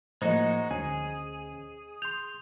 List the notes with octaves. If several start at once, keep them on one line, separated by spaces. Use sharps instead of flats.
A2 F3 G#3 A#3 D#4 F#4 C5 D#5
D2 C#4 G#4 G#5
C6 G6 F7